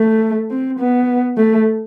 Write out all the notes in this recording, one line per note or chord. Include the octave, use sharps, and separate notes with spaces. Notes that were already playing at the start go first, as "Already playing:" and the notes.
Already playing: A3
C4
B3
A3